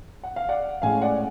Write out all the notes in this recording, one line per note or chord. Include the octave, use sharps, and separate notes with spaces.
F#5
F5
D5 F#5
A2 G#3 C#4 F5 G#5
D5 F#5